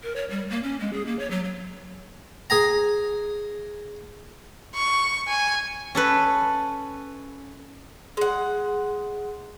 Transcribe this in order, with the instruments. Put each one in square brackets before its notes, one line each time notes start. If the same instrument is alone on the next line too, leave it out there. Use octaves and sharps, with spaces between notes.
[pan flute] A#4
C#5
G3
A#3
C#4
G#3
G#4
A#3
C#5
F#3
F#3
[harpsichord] G#4 G#5 A#5
[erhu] C#6
G#5
[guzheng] C#4 A4 B4
[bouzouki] G#3 F#5